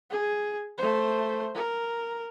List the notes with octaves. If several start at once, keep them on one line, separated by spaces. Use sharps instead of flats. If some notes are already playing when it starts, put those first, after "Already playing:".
G#4
A3 C5
A#4